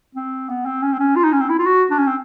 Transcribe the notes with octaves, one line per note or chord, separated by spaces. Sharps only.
C4
B3
C4
C#4
C4
C#4
F4
D#4
C#4
C4
E4
F4
F#4
D4
C#4
C4